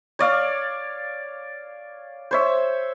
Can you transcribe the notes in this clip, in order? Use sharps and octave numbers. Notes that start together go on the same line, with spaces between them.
C#5 D5 F5
C5 C#5 E5